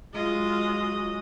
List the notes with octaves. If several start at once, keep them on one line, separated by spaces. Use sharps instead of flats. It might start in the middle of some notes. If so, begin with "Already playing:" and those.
F#3 G#3 F4 D#5